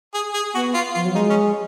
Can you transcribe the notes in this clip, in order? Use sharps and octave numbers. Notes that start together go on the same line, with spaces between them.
G#4
G#4
B3 F#4
F4
F3 F4
F#3
G#3 D#4
C#4